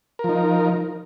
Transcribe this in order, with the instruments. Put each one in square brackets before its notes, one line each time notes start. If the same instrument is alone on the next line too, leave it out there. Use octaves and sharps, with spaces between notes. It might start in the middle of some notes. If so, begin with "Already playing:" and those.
[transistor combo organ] A#4
F3
D#4